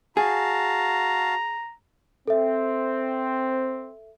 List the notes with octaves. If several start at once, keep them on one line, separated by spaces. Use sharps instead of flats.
F#4 G#4 F5 A5 A#5
C4 A4 E5